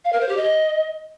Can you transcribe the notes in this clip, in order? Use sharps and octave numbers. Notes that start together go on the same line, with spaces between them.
F5
A#4
C5
G4
D#5